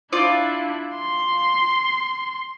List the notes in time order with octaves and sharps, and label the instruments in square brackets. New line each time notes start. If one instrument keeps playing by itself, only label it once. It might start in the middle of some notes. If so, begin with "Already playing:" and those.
[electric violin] D4 E4 [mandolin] F4 D5
[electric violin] C6